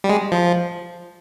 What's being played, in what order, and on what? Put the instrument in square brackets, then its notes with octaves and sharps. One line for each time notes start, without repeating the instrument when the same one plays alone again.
[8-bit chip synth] G3
G#3
F3